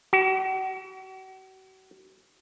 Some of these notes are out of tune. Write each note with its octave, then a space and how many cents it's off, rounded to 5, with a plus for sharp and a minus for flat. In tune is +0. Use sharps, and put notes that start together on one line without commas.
F#4 +40